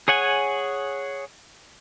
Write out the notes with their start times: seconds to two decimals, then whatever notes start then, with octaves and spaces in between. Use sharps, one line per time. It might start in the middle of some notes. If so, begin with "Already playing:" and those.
0.08 G#4 C#5 F#5 G#5